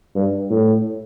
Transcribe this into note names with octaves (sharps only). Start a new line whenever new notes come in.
G2
A2